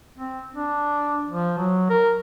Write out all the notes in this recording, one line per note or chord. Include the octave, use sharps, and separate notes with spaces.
C4
D4
F3
F#3
A#4